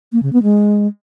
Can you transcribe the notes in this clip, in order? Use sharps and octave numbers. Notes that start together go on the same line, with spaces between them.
A#3
C#3
B3
G#3